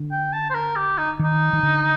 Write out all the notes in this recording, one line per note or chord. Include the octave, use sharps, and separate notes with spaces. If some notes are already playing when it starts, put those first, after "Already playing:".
Already playing: D3
G5
A5
C5
A#4
G4
D#4
D#3 D#4
D#3
D3